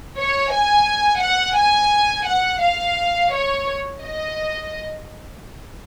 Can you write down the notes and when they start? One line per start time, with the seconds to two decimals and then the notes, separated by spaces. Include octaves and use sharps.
0.18 C#5
0.52 G#5
1.22 F#5
1.57 G#5
2.27 F#5
2.62 F5
3.33 C#5
4.03 D#5